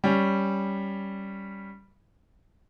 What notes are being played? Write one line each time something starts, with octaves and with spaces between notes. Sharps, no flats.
G3 C#4